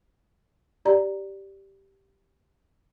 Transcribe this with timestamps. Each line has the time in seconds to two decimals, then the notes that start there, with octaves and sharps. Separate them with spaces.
0.85 G4 D5 A#5